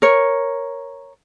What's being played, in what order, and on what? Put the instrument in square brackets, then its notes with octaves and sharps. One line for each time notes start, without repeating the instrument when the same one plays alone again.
[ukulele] A#4 C#5